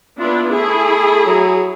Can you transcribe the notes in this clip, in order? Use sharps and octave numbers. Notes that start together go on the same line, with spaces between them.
B3 D4 E4 F4
A3 E4 G#4
F#3